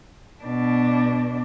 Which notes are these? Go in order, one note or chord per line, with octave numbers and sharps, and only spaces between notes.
B2 D4